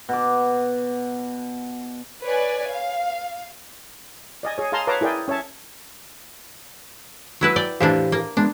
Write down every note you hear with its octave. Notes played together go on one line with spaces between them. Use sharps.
B2 D6
B4 C#5 D5 G#5
F5
D5 D#5 G#5
G#4 C#5
G#4 F5 A5 A#5 C6
B4 C#5 F5 A5 A#5 D6
E4 G#4 A#4 D5 G5
C#4 C#5 E5 A5
F#3 E4 B4
D5 G5
A2 E3 D4 G4 C5 F5
A#3
G#3 B3 D4